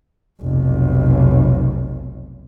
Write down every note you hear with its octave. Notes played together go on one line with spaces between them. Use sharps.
F1 B1